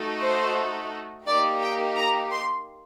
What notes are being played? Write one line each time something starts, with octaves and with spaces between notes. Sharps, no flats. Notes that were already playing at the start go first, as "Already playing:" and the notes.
Already playing: A3 D#4 F#4 A4
C5
A#3 D#4 G4 D5
G5
A#5
C6